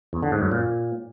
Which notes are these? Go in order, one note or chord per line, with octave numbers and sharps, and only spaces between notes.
E2
D3
G#2
F#2
A#2